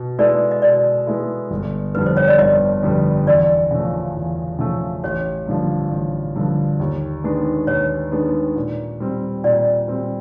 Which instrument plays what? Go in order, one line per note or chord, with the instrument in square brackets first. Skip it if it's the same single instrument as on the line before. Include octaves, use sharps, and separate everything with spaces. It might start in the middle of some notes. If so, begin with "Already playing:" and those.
Already playing: [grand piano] B2
[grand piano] G#3 B3 E4 A4 [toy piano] D5
[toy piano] D#5
[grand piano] B2 [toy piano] D5
[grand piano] G#3 B3 E4 A4
G1
[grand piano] F2 D3 G3 B3 [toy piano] B4
[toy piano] C5
C#5
D5
[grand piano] G1 [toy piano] D#5
[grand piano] F2 D3 G3 B3
[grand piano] E2 [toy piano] D5
[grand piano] C#3 F3 A3
E2
C#3 F3 A3
[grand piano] A1 [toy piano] C#5
[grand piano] G2 D3 F3
A1
G2 D3 F3
D#2
D#3 G#3 B3 D4
[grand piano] D#2 [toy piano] C#5
[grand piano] D#3 G#3 B3 D4
A#2
G3 C4
[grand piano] A#2 [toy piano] D5
[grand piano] G3 C4